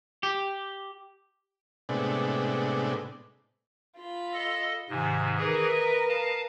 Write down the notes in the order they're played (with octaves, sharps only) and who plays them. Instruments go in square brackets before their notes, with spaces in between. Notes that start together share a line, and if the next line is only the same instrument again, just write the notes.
[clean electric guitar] G4
[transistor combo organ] A2 C3 G#3 B3 D4
[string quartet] F4 B5
[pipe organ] A4 D#5
[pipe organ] G#2 C3 [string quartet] D#3 G#5
[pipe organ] E3 G#4 [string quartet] A#4 B4 D#5
[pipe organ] E5
F5 A5